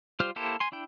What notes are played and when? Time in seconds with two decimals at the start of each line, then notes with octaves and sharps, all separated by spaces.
0.20 G3 F4 G4 C5 F6
0.36 A#3 E4 G4 A4 C5
0.60 G#5 C6
0.72 D4 E4 G5